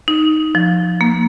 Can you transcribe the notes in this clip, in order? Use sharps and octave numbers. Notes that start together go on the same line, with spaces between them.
D#4
F3
A#3